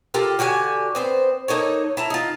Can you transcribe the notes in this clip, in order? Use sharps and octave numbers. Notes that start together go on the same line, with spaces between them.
F4 G4 A4 A#4
D3 F#4 G4 G#5
B3 C4 C5
A#3 D#4 A4 C#5
E4 A5 A#5
D#4 F4